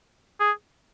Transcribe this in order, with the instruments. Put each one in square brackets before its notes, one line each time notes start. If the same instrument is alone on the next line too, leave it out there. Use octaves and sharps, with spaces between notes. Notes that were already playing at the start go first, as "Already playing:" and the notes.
[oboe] G#4